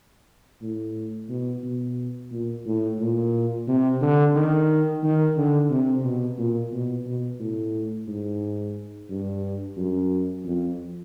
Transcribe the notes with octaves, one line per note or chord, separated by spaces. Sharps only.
A2
B2
B2
A#2
A2
A#2
C3
D3
D#3
D#3
D3
C3
B2
A#2
B2
B2
A2
G#2
G2
F#2
F2